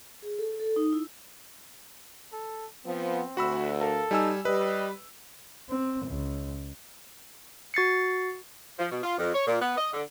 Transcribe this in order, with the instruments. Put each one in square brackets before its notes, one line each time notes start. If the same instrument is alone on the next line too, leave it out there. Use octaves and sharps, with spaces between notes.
[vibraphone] G#4
A4
A4
D#4
E4
[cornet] A4
[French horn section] F3 B3 [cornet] C4
[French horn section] D2 [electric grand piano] F#4 B5 E6
[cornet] A4 [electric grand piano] A#4 F5
[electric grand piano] G3 G#5 E6 [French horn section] D#4
[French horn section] G3 [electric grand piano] B4 [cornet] D#5
[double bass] C4
C#2
[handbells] F#4 A6 C7 C#7
[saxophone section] F3
B2
F4
F2
C#5
A#2
B3
D#5
D3